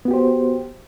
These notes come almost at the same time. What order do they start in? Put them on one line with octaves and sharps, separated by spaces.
B3 F#4 G4 C5